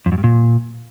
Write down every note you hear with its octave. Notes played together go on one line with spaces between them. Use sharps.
F2
F#2
G2
A#2